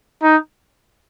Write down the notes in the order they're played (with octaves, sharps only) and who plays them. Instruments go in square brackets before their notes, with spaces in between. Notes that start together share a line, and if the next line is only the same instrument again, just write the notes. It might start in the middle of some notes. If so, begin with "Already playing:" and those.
[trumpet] D#4